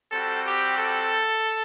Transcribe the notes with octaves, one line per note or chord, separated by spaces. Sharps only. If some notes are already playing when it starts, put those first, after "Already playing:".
G3 C4 F#4 A4
G4
A4